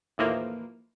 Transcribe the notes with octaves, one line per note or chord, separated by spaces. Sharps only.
D#2 A2 E3 F3 A#3